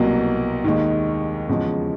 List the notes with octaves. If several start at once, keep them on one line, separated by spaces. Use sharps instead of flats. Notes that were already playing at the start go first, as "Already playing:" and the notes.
Already playing: C2 B2 F#3 A#3
D#2 D#3 G#3
E2 C#3 F3 G#3